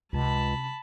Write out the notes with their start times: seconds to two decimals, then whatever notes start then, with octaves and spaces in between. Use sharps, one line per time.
0.13 C#2 C3 C#4 A5 B5